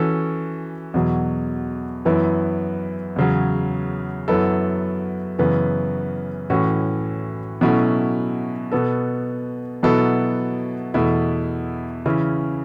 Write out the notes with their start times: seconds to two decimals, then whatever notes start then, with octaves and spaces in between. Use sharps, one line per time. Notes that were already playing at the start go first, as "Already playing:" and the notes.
Already playing: E3 C#4 F#4 A4
0.94 E2 B2 F#3
2.05 F#2 E3 B3 E4
3.16 E2 C#3 F#3
4.28 F#2 F#3 B3 E4 A4
5.39 F#2 C#3 E3 B3
6.50 A2 E3 C#4 F#4
7.61 B2 F#3 A3 C#4 E4
8.72 B2 B3 A4
9.83 B2 F#3 B3 E4 A4
10.94 E2 B2 A3 E4
12.06 C#3 E3 C#4 E4